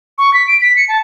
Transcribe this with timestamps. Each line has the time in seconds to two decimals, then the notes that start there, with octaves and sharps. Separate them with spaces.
0.18 C#6
0.34 B6
0.48 D7
0.61 B6
0.76 C#7
0.89 A5